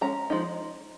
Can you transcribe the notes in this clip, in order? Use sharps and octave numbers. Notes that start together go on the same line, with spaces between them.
G#3 C#4 A#5
F3 G#3 D#4